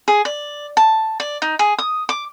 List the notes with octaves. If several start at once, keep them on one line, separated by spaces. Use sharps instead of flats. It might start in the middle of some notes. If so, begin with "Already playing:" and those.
G#4
D5
A5
D5
D#4
G#4
D#6
D6